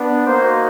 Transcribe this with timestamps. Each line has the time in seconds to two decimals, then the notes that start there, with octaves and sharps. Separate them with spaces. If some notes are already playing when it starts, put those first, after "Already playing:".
Already playing: B3 D4
0.26 A#3 D#4 F#4 C5